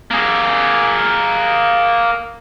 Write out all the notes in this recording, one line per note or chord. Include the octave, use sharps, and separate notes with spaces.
A#3 G#4